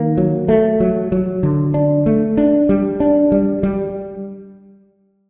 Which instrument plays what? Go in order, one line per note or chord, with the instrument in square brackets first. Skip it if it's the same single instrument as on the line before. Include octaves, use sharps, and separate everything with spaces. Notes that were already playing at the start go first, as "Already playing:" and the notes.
Already playing: [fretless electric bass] D#3 A#3
F#3
A3
F#3
F#3
D3
D4
A3
D4
G3
D4
G3
G3